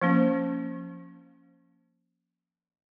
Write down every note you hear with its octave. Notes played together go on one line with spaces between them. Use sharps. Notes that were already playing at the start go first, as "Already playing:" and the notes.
F3 A#3 C#4